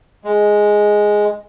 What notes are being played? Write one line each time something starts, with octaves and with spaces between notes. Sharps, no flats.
G#3